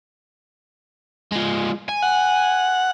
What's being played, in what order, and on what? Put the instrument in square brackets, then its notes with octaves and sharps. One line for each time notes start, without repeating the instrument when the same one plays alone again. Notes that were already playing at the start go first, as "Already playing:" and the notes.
[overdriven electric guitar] F3 G#3
G#5
[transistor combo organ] F#5